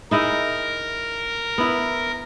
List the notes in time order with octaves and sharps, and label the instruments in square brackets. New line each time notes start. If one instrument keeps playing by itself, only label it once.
[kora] D#4 E4 G#4 [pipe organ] A#4
[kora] B3 E4